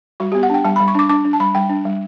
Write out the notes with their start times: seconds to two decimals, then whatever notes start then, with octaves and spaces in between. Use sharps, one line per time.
0.20 G3 F#4
0.32 G4
0.35 B3
0.43 F#5
0.50 D4 G5
0.65 G3 A5
0.76 B5
0.80 G3
0.88 C#6
0.95 D4 D6
1.09 D4 D6
1.25 D4
1.33 A5
1.40 G3 B5
1.55 G3 G5
1.69 D4
1.85 G3